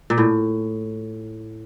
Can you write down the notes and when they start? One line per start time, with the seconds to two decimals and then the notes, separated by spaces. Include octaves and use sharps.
0.10 A#2
0.18 A2